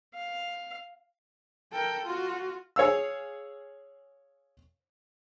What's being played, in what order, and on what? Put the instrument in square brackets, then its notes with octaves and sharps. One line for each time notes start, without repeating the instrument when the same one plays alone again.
[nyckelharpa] F5
[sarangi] A4 [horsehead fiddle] A#4 G5
[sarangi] F4 [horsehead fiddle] F#4
[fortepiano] G#4 C#5 F5 E6